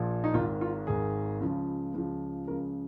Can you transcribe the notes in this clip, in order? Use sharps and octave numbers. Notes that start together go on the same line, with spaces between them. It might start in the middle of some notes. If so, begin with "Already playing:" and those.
Already playing: A#1 A#2 F3
D#4
G#1 G#2 D#3 F4
F4
G#1 G#2 D#3 G#4
C#2 C#3 F3
C#2 C#3 F3
C#2 C#3 F3 A#4